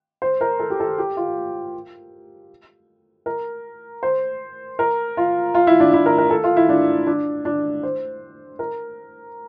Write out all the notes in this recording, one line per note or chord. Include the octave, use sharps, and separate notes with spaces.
C5
A#4
A4
G4
A4
G4
F4
A#4
C5
A#4
F4
F4
E4
D4
E4
A#4
A#4
A4
F4
E4
D4
D4
D4
C5
A#4